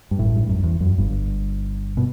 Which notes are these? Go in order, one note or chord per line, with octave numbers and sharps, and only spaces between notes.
G2
A1 A2
G2
F#2
E2
F#2
G1 G2
B2